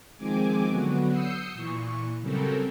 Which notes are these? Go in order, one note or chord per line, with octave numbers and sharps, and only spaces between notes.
D#3 F3 G#3 C4 G#5 D6
D3 F#3 B3 F#4
D#6 E6 G6 C7 C#7
A#2 E3 C#6
C#3 F#3 G3 C4 A4 A#4